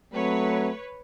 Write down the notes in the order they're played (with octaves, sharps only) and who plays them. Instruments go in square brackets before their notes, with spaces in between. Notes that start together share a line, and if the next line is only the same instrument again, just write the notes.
[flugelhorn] F#3 [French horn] A3 [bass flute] C4 [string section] B4 C#5